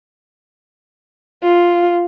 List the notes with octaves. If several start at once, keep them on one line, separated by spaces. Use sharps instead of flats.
F4